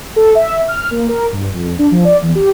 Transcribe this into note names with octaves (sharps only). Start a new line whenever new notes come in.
A4
E5
F6
A#3
A#4
G2
F2
D4
F3
D5
E2
G4